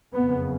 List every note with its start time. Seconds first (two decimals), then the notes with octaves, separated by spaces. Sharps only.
0.14 F#1 F2 C#3 B3